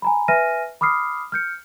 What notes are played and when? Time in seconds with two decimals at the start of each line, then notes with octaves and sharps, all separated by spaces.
0.02 G#5 A#5 B5
0.28 B4 E5 G#5 F6 A#6 D#7
0.81 B5 D6 D#6 F6 C7
1.32 F6 G6 C#7